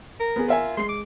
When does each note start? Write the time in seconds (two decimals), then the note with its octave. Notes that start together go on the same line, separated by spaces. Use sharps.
0.20 A#4
0.36 B3 G#4
0.48 F4 A#4 E5 G#5
0.77 G#3 C6 C7
0.89 D6